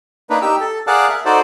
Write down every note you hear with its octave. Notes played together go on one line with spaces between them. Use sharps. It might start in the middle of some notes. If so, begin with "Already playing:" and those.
A#3 D4 D#4 B4
D#4 G4 E6
A4
G#4 A#4 D5 F5 F#5 A5
A#4 E5
D#4 F#4 A4 C5 D5